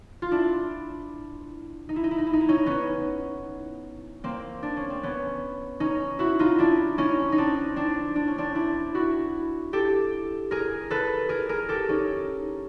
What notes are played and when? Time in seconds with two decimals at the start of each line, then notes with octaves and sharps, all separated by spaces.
0.22 F4
0.32 D4 E4
1.89 D#4
1.96 E4
2.04 D#4
2.11 E4
2.18 D#4
2.26 E4
2.33 D#4
2.41 E4
2.48 C#4 D#4
2.66 B3 C#4
4.24 A#3 C4
4.63 D4
4.77 C#4
4.90 C4
5.03 B3 C#4
5.80 C#4 D#4
6.19 E4 F#4
6.39 D#4 F4
6.59 D4 E4
6.98 C#4 D#4
7.32 D#4
7.38 C4 D4
7.76 C4 D4
8.16 D4
8.27 C#4
8.38 C4 D4
8.55 D4 E4
8.95 E4 F#4
9.73 G4 A4
10.51 G#4 A#4
10.90 A4 B4
11.29 G#4 A#4
11.49 G#4 A#4
11.69 G4 A4
11.89 C#4 D#4